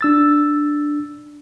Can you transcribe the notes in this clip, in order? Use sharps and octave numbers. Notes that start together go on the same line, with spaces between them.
D4 E6 A6